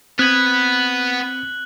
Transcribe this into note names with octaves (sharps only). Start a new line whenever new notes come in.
B3 C4 B4 D#6 F#6 G#6 F#7